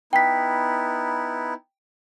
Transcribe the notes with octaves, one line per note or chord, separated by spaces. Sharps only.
B3 D#4 E4 G5 B6